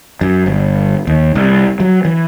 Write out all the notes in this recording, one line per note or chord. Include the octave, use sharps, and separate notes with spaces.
F#2
G1
D#2
C2
F#3
E3